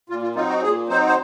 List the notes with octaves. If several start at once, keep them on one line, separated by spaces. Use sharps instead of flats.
A#2 F4
F4
F#3 C4 D#4 F4
F#4
A#2 G#4
F#3 C4 D#4 C5
C5